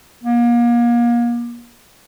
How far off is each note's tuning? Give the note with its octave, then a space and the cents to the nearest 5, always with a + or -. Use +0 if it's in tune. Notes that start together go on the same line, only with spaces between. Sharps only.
A#3 +35